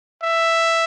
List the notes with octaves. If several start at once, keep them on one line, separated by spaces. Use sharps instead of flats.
E5